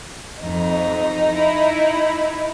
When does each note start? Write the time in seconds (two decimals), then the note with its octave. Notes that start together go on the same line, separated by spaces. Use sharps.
0.41 F2 D#4
1.32 E4